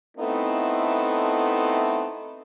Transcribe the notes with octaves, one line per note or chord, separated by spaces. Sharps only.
A3 B3 C4 D#4 E4 A4